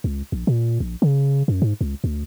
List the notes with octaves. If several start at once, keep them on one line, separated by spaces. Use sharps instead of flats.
C#2
A#1
A#2
A#1
C#3
F#2
G#2
C#2
D2